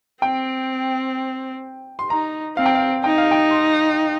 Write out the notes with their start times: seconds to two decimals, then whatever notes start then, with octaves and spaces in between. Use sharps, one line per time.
0.22 C4 G5
1.99 C6
2.10 D#4 A#5
2.57 C4 F5
2.66 G5
2.75 F5
3.04 D#4 G5
3.18 F5
3.31 G5
3.51 C6